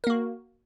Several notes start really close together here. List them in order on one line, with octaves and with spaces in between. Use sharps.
A#4 A#3 F#4